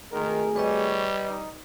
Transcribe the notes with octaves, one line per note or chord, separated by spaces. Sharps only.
G#1 D#3 A3 G#4 A#4
G3 B4 C#5 D#5
D#4